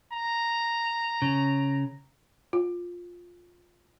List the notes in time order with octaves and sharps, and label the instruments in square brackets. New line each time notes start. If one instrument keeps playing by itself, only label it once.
[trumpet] A#5
[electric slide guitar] C#3
[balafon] F4